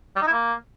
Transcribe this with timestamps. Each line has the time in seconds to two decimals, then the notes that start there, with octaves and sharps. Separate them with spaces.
0.16 G3
0.22 D#4
0.27 E4
0.33 A#3